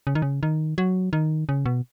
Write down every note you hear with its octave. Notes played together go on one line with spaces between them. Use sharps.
C#3
D#3
C#3
D#3
F#3
D#3
C#3
B2